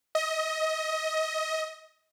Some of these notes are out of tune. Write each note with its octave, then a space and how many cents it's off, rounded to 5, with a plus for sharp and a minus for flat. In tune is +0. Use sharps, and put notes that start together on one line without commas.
D#5 +25